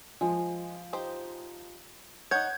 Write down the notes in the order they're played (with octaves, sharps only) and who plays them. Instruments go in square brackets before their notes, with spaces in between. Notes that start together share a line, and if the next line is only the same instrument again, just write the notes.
[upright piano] F3 [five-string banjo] G#3
[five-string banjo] D#4 G4 C5
[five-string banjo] D#4 C#5 [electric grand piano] F#5 G6 G#6